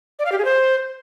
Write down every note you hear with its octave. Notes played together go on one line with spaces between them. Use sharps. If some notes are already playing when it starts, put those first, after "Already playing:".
D5
F5
G4
G#4
C5